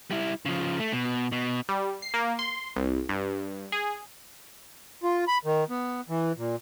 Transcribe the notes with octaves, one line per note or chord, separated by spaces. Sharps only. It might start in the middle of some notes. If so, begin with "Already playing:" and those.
G3 E4
C#3 F3
A3
B2
B2
G3
C7
A#3
C6
C2
G2
G#4
F4
B5
D#3
B3
E3
A#2